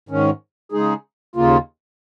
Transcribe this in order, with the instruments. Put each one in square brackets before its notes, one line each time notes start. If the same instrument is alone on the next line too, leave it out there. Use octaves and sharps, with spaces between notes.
[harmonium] G#2 D#3 C#4
C#3 G#3 D#4 G#4
D#2 C#3 A#3 F4